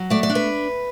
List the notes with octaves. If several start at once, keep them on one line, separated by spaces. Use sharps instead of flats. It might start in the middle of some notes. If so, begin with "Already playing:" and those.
Already playing: F#3
A3 D5
D5
D4
B4